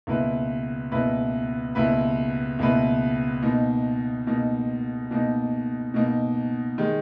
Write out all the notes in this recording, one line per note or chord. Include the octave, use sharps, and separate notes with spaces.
C#2 B2 A#3 E4 B4
C#2 B2 A#3 E4 B4
C#2 B2 A#3 E4 B4
C#2 B2 A#3 E4 B4
B2 A#3 D#4
B2 A#3 D#4
B2 A#3 D#4
B2 A#3 D#4
D#3 G#3